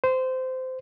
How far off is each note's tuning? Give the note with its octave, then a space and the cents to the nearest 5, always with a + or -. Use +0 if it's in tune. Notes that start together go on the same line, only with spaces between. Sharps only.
C5 -20